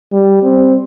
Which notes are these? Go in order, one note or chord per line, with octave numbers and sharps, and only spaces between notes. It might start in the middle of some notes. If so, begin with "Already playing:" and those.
G3
C4